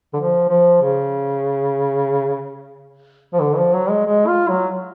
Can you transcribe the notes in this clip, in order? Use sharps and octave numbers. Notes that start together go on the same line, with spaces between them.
D3
F3
F3
C#3
F3
D3
F3
F#3
G#3
G#3
F4
F#3